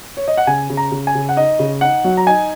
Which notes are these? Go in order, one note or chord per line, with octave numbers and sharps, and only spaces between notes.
C#5
D#5
F#5
C#3 G#5
C#3
A#5
C#3
G#5
C#3
F#5
D#4 D#5
C#3
D#4 F#5
F#3
A#5
D#4 G#5